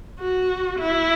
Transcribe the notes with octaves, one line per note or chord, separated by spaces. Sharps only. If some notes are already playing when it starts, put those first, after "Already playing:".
F#4
E4